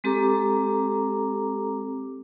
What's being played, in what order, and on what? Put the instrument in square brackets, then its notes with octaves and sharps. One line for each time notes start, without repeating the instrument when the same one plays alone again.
[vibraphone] G#3 C4 G4 A4 A#5 D6